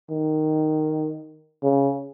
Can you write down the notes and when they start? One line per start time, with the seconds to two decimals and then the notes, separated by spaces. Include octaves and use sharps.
0.10 D#3
1.63 C#3